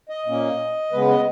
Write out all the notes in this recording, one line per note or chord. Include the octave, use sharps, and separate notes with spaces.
D#5
A#2 A#3 C#4
C#3 G#3 B3 B4
D#5